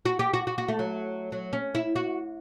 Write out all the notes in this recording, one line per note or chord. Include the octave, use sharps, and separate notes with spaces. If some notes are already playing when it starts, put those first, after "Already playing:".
F#4
G4
F#4
F#4
F#4
A3
F#3
F#3
C#4
E4
F#4